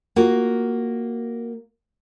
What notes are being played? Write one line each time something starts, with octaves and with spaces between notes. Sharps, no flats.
A#3 F4 F#4 A#4